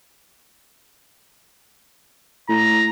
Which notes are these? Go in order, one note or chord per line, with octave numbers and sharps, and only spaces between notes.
A2 A#5